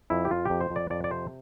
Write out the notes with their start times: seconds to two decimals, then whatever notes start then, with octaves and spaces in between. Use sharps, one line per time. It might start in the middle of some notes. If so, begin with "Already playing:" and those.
0.10 F2 E4
0.25 G4
0.31 F2 F4
0.45 F2 G4
0.61 C5
0.70 F2
0.76 D5
0.90 F2 D5
1.04 D5
1.11 C3 C5